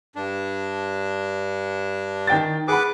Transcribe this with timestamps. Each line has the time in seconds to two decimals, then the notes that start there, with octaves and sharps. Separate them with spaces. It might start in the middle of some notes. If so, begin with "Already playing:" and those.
0.16 G2 D4
2.27 D#3 G5 A6
2.68 G#4 B4 F#5 B5 D6